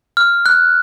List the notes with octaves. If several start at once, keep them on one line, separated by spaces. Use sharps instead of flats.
F6
F#6